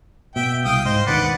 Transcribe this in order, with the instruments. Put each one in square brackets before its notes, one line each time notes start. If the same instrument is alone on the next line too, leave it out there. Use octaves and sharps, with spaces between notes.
[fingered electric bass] B2 [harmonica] E5 G5
[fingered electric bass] C2 [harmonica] F5 G5 D#6
[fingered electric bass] G#2 [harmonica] C5 D#5
[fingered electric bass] E1 D2 D#3 [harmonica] B4 D5 F#5